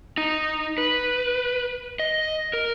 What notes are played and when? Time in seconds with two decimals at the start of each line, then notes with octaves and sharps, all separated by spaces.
0.18 D#4
0.78 B4
1.99 D#5
2.53 A#4